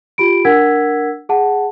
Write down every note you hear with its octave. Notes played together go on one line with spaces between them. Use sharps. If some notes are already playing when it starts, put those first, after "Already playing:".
F4 G4 B5 D7
D4 A#4 F#5 E6 G#6 B6
G#4 F#5 A5